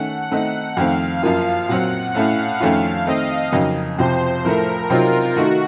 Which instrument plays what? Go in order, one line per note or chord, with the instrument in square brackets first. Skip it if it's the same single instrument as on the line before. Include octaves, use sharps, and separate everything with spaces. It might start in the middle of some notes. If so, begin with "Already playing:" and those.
Already playing: [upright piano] D#3 A3 C#4 [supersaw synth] F#5
[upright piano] D#3 A3 C4 D#4 [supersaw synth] F#5
[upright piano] F2 D#3 A3 C4 [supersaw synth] F5
[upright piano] F#2 F3 A#3 F4 [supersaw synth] F5
[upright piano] A#2 F#3 C4 [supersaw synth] F#5
[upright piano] A2 A3 C#4 [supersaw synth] F5
[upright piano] F2 D#3 A3 C#4 F4 [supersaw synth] F5
[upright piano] D#3 A3 C4 [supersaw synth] D#5
[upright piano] F2 C#3 F#3 A#3 D#4
[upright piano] F2 C3 F3 [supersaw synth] C5
[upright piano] A2 F3 A3 [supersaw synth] A#4
[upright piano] C3 F#3 C4 D#4 [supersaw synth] F4
[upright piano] D#3 A3 D#4 [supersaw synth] F#4